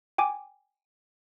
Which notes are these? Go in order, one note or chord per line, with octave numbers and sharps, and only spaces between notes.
G5 G#5 D6